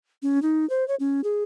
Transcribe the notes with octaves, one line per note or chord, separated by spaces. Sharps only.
C#4
D#4
C5
C#5
C#4
G#4